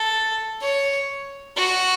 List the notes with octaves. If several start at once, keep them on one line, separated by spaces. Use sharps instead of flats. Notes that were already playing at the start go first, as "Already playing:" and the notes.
Already playing: A4
C#5
F#4